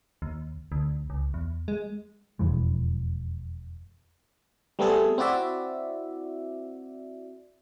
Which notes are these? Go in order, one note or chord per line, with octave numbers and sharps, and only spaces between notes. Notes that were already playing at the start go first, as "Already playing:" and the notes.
D#2
D2
C#2
E2
G#3
E1 F2 E3 G#3
G3 A3 B3 C4 G#4 A4
C4 E4 F#4 D5 E5